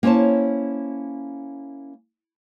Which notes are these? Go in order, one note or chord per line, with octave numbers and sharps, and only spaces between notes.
A#3 C#4 E4 C5 C#5 A5